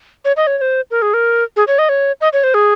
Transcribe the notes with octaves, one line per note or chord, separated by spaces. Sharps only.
C#5
D#5
C#5
C#5
C5
A#4
G#4
A#4
G#4
C#5
D#5
C#5
D#5
C#5
C5
G#4